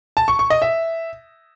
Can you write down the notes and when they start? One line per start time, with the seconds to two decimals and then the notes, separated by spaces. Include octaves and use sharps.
0.17 A5
0.28 C#6
0.39 C#6
0.50 D#5
0.62 E5